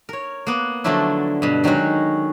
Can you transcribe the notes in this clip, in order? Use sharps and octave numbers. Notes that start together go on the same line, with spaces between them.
A#4 C#5
A#3 B3
D3 F3 F#3 A3 D4 E4
G2 B2
D#3 F#3 G#3 C#4 F#4